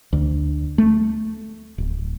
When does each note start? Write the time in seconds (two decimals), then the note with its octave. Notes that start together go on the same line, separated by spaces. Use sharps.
0.13 D2
0.78 A3
1.78 D1